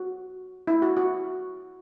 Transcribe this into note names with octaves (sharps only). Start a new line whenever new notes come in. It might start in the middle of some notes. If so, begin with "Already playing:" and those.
Already playing: F#4
E4
F#4
F#4